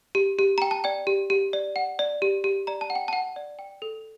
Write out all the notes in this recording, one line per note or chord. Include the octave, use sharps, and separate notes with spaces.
G4
G4
G5 A#5
A5
D5 G5
G4
G4
D5
F#5
D5
G4
G4
D5 A#5
A5
F#5
G5
F#5 A5
D5
G5
A4